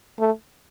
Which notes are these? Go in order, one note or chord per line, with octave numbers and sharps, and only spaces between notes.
A3